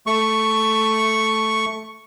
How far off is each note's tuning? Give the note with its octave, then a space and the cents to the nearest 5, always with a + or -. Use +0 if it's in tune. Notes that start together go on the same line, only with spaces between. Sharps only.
A3 +0 C#6 +0